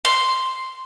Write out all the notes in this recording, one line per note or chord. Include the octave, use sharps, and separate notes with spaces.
C6